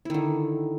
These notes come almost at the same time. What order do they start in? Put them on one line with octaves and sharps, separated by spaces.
E4 D#3 D3